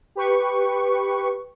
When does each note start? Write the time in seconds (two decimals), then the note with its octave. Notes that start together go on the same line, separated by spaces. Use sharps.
0.15 G4 B4 C#6